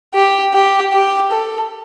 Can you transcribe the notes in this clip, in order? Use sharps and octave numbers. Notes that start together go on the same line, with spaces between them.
G4
G4
G4
A4